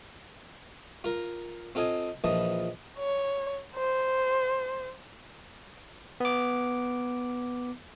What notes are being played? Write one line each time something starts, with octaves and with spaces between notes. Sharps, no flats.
F4 A#4
C4 F4 A4 D#5 G#5
A#1 E3 F3 D#5 A5
C#5
C5
B3 D6